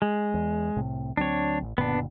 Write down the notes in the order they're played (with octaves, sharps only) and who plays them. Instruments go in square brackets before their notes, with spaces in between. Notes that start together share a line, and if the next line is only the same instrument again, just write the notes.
[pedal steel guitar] G#3
[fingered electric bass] E2
C2 A2 C3
[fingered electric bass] D2 F#3 C4 [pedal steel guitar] D4 C#5
[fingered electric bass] A1
[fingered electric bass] F#1 A#2 D3 [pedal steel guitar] B3 D4